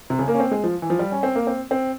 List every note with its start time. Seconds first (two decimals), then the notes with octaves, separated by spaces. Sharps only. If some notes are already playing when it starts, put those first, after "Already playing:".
0.10 C3
0.19 C#3
0.28 A#3
0.34 C#4
0.40 C4
0.51 G#3
0.64 F3
0.82 E3
0.90 F3
0.99 G3
1.11 C#4
1.23 C4
1.35 A#3
1.47 C4
1.71 C4